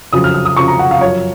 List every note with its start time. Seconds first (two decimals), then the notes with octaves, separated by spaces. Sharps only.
0.13 F2 C#3 F#3 D#6
0.24 F6
0.34 F6
0.45 D#6
0.57 F2 C#3 F#3 C#6
0.68 A#5
0.79 F#5
0.91 F5
1.01 F#2 F3 C#5